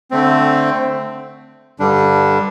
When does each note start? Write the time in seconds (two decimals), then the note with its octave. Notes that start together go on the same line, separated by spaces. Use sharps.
0.11 D3 A3 C4
1.80 G2 D3 G3 D4